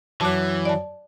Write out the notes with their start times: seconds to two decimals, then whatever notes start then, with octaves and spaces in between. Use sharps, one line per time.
0.21 F#2 E3 F#3 A5 D6 F#6
0.65 D5 A5